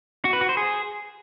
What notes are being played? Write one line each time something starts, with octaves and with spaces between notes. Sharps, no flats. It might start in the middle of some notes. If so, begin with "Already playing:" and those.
F#4
B4
F#4
C5
G#4